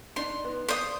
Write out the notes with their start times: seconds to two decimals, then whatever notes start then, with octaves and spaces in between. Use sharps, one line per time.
0.16 D4 D#4 C6
0.44 B3 D#4
0.68 G#4 C5 D5 F5 D#6